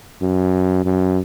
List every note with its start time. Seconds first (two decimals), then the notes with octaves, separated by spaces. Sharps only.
0.22 F#2
0.85 F#2